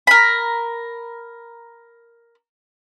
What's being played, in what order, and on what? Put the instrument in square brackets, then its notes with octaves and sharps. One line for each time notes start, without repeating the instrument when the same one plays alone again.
[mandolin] A#4 B5